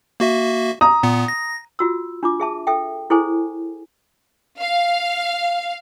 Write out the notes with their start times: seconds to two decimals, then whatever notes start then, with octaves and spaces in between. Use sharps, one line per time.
0.20 A#3 F#4 E5
0.81 A#5 D#6
1.03 A#2 B3
1.28 A#6
1.79 F4 F#4 E6
2.23 D4 F4 D6
2.40 G#4 E5 A5
2.67 A4 E5 G5
3.10 E4 G#4 A4 C5 G#5
4.60 F5